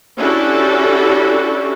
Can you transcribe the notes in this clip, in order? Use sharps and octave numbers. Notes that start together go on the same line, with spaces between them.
C#4 D4 E4 F#4 G4 A4